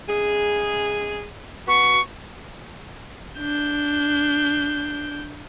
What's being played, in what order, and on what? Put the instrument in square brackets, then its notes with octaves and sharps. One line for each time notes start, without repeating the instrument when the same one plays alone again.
[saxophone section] C#3 G#3 G#4
[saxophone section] B3 F#4 [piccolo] C#6
[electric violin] D4 G6